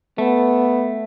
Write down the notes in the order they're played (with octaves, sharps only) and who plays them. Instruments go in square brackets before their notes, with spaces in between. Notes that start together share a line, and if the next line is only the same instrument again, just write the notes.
[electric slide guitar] A3 [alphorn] B3